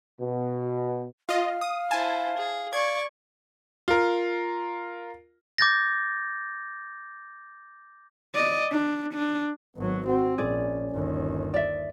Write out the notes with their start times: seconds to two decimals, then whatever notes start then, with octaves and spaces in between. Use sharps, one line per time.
0.21 B2
1.29 F4 D#5 F5
1.61 D#6
1.91 E4 C5 G#5 A5
2.37 G#4
2.73 D5 C#6 G#6
3.88 F4 A#4
5.58 D6 G6 A6 A#6
8.34 D5 D#5
8.72 D4
9.14 D4
9.77 G#1 F#3 B3
10.07 C4 F#4
10.38 A#1 C#4 G#4 D5
10.90 G1 D#2
11.54 D5 E5